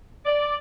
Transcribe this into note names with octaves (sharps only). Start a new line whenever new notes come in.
D5